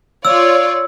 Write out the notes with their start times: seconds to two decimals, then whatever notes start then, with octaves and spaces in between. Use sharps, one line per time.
0.25 F4 C#5 D5 E6